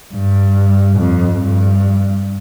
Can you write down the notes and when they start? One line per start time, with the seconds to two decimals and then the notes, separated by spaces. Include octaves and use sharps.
0.13 G2
0.97 F2
1.40 G2